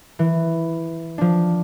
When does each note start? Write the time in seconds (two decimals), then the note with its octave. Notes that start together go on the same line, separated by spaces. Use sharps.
0.19 E3
1.18 F3 D4